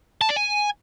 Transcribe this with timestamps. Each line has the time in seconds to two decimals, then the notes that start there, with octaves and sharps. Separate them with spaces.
0.21 A5
0.29 D5
0.36 G#5